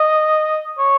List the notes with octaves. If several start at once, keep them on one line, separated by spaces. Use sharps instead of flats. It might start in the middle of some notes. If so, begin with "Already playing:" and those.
Already playing: D#5
C#5